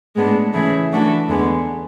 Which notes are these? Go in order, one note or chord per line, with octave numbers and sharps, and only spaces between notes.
A2 G#3 B3 D4
C#3 E3 A3 E4 G#4
E3 A3 D4 F#4 A4
E2 D3 G#3 B3